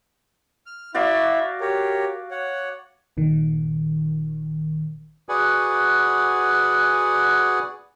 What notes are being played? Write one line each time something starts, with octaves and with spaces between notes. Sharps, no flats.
F6
E4 F#4 D5 E5 F5
G4 A#4 C#5
C#5 F#5
G1 A#2 D#3
F#4 G#4 B4 D5 F#5 G#5